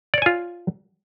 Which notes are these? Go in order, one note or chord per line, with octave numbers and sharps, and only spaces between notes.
F4 C#5 D5 G#5